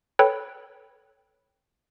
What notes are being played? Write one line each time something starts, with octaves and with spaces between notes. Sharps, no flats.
A4 B4 C#5 G5 B5